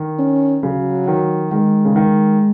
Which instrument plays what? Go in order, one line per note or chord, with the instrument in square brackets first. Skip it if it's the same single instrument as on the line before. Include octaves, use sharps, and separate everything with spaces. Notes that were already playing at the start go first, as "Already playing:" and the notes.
Already playing: [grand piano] D#3
[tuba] C#4
[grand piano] C#3 [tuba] F#3
[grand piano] D#3
[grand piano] D#3 [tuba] G#3
[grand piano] C#3
D#3